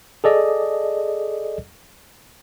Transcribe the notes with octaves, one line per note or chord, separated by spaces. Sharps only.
G#4 A4 D5 D#5